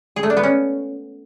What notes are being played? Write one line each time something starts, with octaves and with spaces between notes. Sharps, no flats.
G#4
A3
D4
B3
C#4